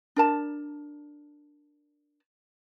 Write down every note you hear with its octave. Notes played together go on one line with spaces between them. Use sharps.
D4 A#4 A5